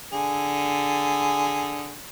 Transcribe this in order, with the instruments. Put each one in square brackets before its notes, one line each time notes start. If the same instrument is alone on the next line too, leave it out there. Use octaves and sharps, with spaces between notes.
[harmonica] D3 G#4